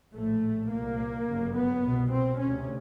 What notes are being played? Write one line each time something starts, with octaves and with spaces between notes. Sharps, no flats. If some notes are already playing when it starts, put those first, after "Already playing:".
A#1 A2 A3
C2 A#2 A#3
G1 F#2 C#3
B3
C2 B2
C4
D2 C3 C#4